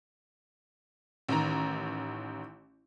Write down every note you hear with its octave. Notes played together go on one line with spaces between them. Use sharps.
A1 D#3 A#5